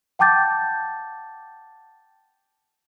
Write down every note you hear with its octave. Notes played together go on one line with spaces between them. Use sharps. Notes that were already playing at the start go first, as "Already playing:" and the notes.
F#5 G5 A5 D6 G6 A6